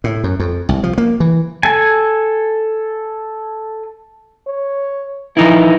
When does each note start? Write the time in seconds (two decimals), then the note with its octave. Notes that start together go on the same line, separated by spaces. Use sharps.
0.04 A2
0.24 F#2
0.40 F2
0.69 C2
0.83 F3
0.98 A#3
1.20 E3
1.63 A4 G#5
4.47 C#5
5.37 E3 F3 D#4 E4